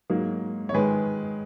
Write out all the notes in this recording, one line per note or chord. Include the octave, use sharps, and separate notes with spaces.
G#2 F#3 A#3
C#5
G#2 D#3 G#3 G#4 B4